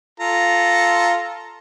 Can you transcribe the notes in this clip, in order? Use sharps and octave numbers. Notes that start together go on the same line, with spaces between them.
F4 A4 A#5